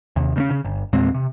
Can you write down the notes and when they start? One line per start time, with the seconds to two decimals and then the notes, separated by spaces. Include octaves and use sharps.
0.16 D#2 C3
0.36 C#3 A#3 C#4
0.51 C#3
0.65 G1
0.93 E2 A#2 G#3 C4
1.15 C3